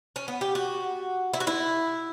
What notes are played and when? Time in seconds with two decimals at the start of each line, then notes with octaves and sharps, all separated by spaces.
0.16 C#4
0.28 B3
0.41 G4
0.55 F#4
1.33 E4
1.40 F#4
1.47 E4